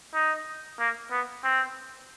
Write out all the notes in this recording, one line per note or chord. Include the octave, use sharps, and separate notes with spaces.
D#4
A#3
B3
C4